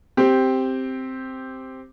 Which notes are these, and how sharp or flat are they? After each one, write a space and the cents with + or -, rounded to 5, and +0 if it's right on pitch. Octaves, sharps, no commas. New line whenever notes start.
C4 +0 G4 +0